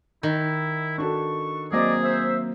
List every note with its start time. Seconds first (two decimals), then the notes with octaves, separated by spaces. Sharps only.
0.23 D#3 E4
0.98 D4 F#4 A4 C#6
1.72 F#3 A#3 C4 G#4 D5 D#5 D6
2.02 C5 E5